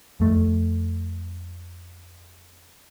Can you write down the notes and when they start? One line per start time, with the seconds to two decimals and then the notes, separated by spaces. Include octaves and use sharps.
0.20 F2 A3